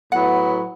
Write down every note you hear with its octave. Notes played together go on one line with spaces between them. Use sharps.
A2 F#3 B3 E4 F#5